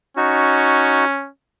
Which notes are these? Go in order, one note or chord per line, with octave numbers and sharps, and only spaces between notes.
C#4 D#4 F#4